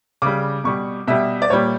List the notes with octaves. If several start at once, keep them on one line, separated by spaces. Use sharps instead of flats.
C#3 G3 D6
B2 G3 C#6
B2 G3 E5
D5
A#2 G3 C#5